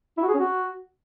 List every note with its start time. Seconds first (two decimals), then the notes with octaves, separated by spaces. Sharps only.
0.18 E4
0.23 F#4
0.29 G#4
0.34 C#4
0.40 F#4